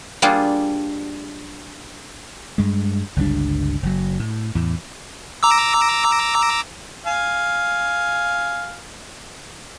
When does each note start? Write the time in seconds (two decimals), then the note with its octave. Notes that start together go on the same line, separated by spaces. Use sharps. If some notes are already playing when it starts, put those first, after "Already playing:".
0.22 G3 A#3 D4 F4 G#4
2.58 G2 G#3
3.16 G1 C#2 G3 D4
3.83 F#1 F#3
4.20 A2
4.55 E2 A2
5.43 A#5 D6 E6
7.07 F5 G#5